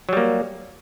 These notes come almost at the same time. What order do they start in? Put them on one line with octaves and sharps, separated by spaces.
F#3 G3 A#3